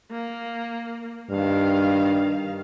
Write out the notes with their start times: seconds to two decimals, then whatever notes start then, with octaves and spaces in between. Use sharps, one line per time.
0.11 A#3
1.31 G2 D#3 F5